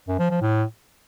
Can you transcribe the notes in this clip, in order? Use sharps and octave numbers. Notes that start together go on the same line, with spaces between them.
F#2
F3
F3
A2